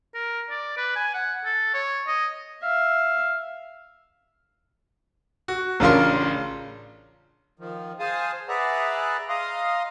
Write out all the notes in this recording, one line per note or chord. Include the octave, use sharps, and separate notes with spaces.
A#4
D5
B4
G#5
F#5
A4
C#5
D#5
E5 F5
F#4
A1 C#3 D4 F4 A#4 C6
D#3 F3
G#4 C5 F5 G#5 A5 D#6
G#4 B4 D5 E5 F#5 A#5
D#5 F5 A#5 C6 D#6